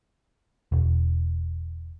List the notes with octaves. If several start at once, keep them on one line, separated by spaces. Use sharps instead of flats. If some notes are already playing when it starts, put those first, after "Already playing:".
E1